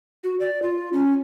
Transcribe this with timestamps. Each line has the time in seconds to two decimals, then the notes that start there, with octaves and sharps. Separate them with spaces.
0.24 F#4
0.40 D5
0.62 F4
0.93 C#4